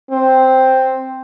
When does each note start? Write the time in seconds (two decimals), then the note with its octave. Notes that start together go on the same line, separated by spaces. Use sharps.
0.11 C4